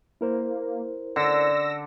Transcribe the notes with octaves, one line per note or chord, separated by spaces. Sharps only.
A#3 E4 A#4 C5
D3 E6 A#6